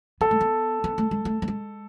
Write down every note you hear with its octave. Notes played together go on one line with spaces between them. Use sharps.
B3 A4
A3
B3
B3
A3
G#3
A3
A3
G#3